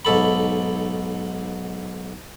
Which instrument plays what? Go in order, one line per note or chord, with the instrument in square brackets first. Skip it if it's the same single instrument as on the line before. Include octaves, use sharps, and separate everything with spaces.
[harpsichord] B1 G#2 A4 B5